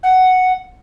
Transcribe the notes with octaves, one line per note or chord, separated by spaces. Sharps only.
F#5